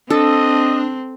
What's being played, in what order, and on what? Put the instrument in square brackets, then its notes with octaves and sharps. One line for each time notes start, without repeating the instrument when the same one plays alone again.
[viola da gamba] C4 [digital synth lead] D4 [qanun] A4 [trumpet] D#5